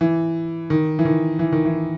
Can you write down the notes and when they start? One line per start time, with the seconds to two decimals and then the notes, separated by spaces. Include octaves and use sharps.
0.01 E3
0.70 D#3
0.99 E3
1.05 D#3
1.39 E3
1.52 D#3
1.65 E3